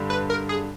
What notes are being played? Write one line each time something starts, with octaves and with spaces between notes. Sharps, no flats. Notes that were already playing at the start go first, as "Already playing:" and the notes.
Already playing: G2 D3 G3
B4
A#4
G#4